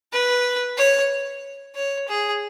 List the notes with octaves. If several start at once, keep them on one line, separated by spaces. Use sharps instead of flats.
B4
C#5
C#5
G#4